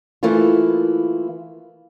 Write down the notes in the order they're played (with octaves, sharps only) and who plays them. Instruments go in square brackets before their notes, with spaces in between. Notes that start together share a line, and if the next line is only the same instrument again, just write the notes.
[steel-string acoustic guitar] E3 A3 A#3 E4 F4